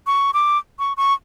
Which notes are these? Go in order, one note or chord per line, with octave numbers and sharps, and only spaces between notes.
C#6
D6
C#6
C#6